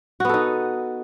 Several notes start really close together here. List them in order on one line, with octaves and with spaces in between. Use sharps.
F#4 B3 A4 D#4